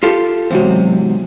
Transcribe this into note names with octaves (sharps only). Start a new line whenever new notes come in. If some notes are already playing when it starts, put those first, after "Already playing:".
F4 G4 A4
E2 G#2 C3 F#3 C4